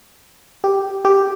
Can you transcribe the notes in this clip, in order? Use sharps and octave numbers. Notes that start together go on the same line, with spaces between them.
G4
G4